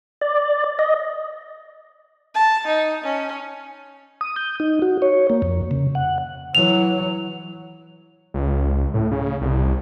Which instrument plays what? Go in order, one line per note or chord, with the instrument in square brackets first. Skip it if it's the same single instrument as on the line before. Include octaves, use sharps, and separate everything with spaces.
[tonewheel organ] D5
D#5
[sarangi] A5
D#4
C#4
[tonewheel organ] D#6
G6
D#4
F#4
C#5
A#3
F2
C#3
F#5
[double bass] E3 F#3 [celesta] F7
[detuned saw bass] C#2
A2
C#3
C2